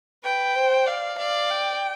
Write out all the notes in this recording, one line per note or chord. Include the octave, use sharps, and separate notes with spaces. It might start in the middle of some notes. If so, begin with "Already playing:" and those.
B4 G5
C5
D5 F5
D5 F5
G5